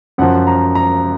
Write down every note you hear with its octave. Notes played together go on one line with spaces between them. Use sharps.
F#2 F3 F#5
A#5
A#5